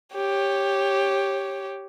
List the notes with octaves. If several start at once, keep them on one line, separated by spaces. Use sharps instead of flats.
G4 C#5